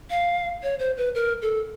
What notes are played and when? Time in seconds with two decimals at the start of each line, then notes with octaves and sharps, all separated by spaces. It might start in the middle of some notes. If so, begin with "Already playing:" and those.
0.10 F5
0.63 C#5
0.79 C5
0.97 B4
1.15 A#4
1.42 A4